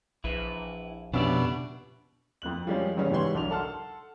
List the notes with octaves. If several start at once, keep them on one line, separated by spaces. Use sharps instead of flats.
A#1 E4 B4
F2 B2 C#4 D4 G4 D5 E5
F2 C4 F#6 F#7
F3 G3 G#3 C#4
A1 G2 C#3 G3 C#4
G#2 E3 G3 C#5 C6
B1 D4 C#5 F7
A4 F#5 A5 C6 F6